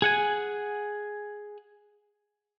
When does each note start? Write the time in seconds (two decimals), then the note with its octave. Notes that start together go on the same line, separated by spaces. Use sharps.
0.02 G#4 F#5 G#5